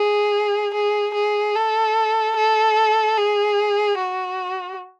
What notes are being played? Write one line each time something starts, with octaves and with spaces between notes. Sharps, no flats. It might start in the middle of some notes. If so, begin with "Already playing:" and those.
Already playing: G#4
G#4
G#4
A4
A4
G#4
F#4